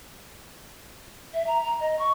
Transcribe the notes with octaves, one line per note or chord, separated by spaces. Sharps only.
E5
A#5
A#5
D#5
C#6